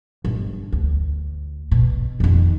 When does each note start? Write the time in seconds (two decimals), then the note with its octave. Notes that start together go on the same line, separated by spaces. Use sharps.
0.25 G1
0.72 D2
1.71 B2
2.20 F2 D#3